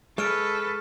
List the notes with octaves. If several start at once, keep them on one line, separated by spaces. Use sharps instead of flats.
G#3 A4 B4 C#6 F6 D7